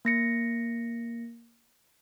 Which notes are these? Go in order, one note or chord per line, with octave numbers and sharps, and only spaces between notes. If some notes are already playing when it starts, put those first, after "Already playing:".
A#3 A#6 C#7